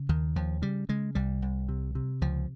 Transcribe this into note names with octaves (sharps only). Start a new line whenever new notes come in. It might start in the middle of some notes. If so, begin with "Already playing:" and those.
Already playing: C#3
D#2 D#3
D#2 F3
C#3 G3
C#3 G#3
C2 G3
C2
C3
C3
C#2 F3